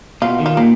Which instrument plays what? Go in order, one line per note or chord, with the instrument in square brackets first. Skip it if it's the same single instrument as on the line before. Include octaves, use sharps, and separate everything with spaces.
[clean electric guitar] B2 [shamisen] F4
[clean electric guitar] D#3
[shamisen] F4
[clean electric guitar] A#2 [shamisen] A#3